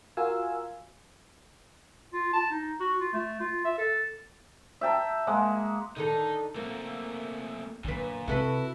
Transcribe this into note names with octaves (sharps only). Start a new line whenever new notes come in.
F4 F#4 A#4 F5 G#5 E6
F4
A5
D#4
F#4
F4
A3
F4
E5
A4
E5 G5 A5 A#5
G#3 A#3 F#5
D3 D#3 D#4 A4
A3 A#3 C4
F#2 A#2 D3 B4
C3 E4 F#4 A4 B4